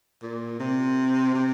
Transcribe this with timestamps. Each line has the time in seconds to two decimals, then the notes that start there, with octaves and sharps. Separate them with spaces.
0.23 A#2
0.59 C3
1.34 C3